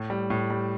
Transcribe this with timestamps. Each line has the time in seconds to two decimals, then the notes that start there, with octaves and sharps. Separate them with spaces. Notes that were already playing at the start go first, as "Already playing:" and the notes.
Already playing: A2
0.10 G3
0.30 A2
0.50 G3